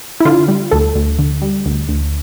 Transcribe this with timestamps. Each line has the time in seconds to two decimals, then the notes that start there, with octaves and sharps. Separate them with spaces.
0.20 E4
0.25 D3 F4
0.48 G3
0.71 D2 A4
0.95 D2
1.19 D3
1.42 G3
1.66 D2
1.89 D2